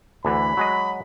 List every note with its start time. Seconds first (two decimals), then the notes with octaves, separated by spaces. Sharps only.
0.25 D2 D3 E3 B5
0.57 F#3 G#3 D#5